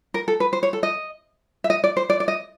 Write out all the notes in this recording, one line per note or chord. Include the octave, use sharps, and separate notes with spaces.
A#4
A4
B4
C5
C#5
A4
D#5
E5
D#5
D5
C5
D5
D5
D#5